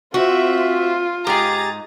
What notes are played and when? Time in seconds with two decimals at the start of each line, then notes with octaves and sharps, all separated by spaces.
0.14 C4 F4 F#4 E5
1.27 G#2 G4 G#4 A#5 D#6 A6